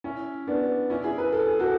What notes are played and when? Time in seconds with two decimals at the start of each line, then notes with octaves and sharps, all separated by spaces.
0.04 C#4 E4
0.47 B3 D4
0.90 C#4 E4
1.04 E4 G#4
1.18 B4
1.32 A4
1.46 G#4
1.60 F#4 A4